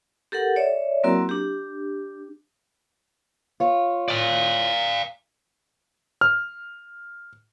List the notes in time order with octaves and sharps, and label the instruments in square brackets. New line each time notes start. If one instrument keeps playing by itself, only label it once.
[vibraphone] G4 A4 A#4 F#5
C#5 D5 E5
F#3 A#3 C4 E4 F#4 A#4
D4 G4
[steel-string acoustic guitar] F4 C#5
[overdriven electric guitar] D5 F5
[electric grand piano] F6